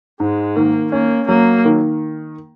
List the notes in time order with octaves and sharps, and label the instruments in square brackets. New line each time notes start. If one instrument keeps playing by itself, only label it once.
[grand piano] G#2 [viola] G#3
[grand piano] D#3 [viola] A#3
[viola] A#3 [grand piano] C#4
[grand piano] F#3 [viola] A#3
[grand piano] D#3